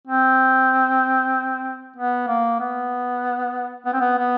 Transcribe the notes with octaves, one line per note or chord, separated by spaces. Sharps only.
C4
B3
A#3
B3
B3
C4
B3
B3